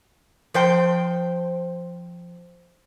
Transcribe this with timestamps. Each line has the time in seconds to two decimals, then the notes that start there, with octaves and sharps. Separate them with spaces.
0.54 F3 C5 G5